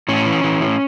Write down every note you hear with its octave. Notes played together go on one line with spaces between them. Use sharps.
A2 C#4
E3
E3
A2